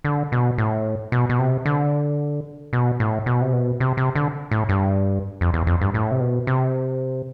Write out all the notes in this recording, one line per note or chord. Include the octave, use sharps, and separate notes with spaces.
D3
B2
A2
B2
B2
C3
D3
B2
A2
B2
C3
B2
C3
C3
D3
A2
G2
F2
E2
F2
G2
A2
C3
B2
C3